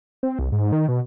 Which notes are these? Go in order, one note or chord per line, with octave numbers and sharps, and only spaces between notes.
C4
C2
G#2
D#3
B2